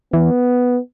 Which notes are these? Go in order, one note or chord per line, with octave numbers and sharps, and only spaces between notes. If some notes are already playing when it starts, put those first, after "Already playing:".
E3 B3